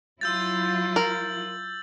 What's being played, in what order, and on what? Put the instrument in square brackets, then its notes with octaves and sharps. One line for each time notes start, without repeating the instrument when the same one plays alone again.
[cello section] F#3 E4 F4 [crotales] E6 G6 A6
[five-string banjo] A#4 [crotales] F#7